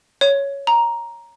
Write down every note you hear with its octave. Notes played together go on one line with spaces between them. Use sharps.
C#5
A#5